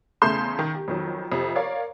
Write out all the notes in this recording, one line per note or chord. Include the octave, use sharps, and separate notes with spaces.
E2 C#3 A3 C6 G6 E7
D#3
G4
F2 D#3 F#3
F2 C3
A#4 C#5 D5 F5